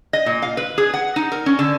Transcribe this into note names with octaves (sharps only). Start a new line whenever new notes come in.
D#5
A#2
F5
B4
G#4
F#5
D#4
A#4
C#4
D3